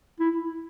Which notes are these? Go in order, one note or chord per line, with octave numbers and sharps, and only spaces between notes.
E4